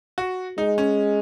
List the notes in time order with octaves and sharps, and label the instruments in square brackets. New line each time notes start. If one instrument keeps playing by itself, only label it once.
[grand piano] F#4
[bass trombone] G#3 [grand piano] D#4
[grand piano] C#4